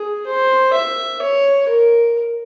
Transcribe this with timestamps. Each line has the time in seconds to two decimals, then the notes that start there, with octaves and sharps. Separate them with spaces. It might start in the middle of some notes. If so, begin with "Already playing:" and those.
Already playing: G#4
0.26 C5
0.73 E5
1.22 C#5
1.69 A#4